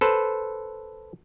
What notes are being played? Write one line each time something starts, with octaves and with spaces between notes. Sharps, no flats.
A4 B4 C5